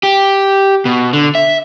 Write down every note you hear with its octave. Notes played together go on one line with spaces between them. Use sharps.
G4
B2
D3
E5